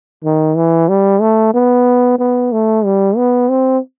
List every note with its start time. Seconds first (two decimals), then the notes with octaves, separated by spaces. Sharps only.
0.24 D#3
0.56 E3
0.89 G3
1.21 A3
1.54 B3
2.19 B3
2.52 A3
2.85 G3
3.17 B3
3.50 C4